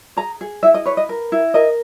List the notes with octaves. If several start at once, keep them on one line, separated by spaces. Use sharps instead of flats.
G#4 A#5
G#4
E4 E5
D#5
B4 C#5
D#5
A#4
E4
A#4 D#5